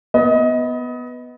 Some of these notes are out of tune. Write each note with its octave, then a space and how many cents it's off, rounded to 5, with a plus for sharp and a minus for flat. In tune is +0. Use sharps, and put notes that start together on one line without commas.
B3 +0 D#5 +25